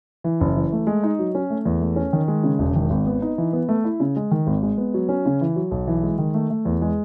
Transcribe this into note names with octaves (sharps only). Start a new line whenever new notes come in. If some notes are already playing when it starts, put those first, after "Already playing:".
E3
F#1
E3
A3
G#3
D#4
F#3
C#4
A3
E2
A3
C#4
D#3
G#3
C#3
E1
D#3
G#1
B3
D#4
E3
B3
A3
E4
C#3
G#3
D#3
G#1
G#3
B3
F#3
C#4
C#3
E3
F#3
B1
E3
G#3
D#3
A3
A3
E2
G#3